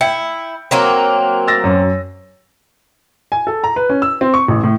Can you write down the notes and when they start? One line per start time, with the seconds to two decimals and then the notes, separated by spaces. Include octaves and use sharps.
0.01 E4 G5 C#7
0.71 F#3 A#3 C4
1.47 E6 A6 A#6
1.64 F#2
3.32 G#5
3.47 A4
3.64 A#5
3.76 B4
3.90 C#4
4.02 E6
4.21 C4
4.34 C#6
4.48 A1
4.64 A2